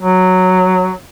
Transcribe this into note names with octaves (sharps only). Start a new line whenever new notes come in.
F#3